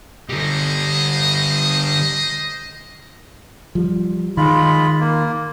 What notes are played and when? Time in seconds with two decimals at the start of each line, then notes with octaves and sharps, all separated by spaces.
0.29 D3 G3 C5 D#5
3.75 F3 G3
4.37 D#3 G#3 F4 B5
5.00 A#3